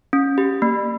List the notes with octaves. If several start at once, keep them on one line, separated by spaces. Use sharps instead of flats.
C#4
G4
A#3